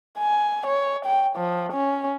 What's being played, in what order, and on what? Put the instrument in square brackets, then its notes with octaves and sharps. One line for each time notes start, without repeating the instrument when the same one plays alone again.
[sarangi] G#5
C#5
G5
F3
C#4